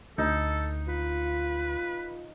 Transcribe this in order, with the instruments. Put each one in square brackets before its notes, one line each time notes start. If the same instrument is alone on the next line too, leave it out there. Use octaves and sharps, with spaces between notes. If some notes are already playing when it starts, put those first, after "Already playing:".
[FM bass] D2 [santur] D#4 [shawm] A4
[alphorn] F4 [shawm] B4